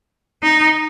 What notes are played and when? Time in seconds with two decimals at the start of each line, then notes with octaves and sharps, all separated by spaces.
0.43 D#4